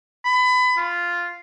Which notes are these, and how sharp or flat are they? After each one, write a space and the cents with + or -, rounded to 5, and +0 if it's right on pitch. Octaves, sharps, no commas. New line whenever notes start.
B5 +25
F4 -5